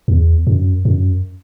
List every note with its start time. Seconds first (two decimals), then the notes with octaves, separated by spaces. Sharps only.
0.08 E2
0.47 F#2
0.85 F#2